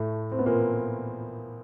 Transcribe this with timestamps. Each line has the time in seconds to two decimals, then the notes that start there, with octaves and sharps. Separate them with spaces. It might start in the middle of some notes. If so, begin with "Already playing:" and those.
Already playing: A2 A3
0.32 C4
0.39 B3
0.46 A#2 A#3